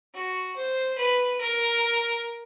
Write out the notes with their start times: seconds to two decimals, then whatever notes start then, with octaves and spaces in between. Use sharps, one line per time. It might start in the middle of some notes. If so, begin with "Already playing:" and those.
0.14 F#4
0.56 C5
0.98 B4
1.41 A#4